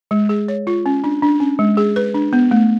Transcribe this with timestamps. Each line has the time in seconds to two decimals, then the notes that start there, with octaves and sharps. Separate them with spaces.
0.11 G#3
0.29 G#4
0.48 C#5
0.67 F4
0.86 C#4
1.04 D4
1.22 D4
1.40 C#4
1.59 G#3
1.77 G#4
1.96 B4
2.14 D4
2.33 B3
2.51 A3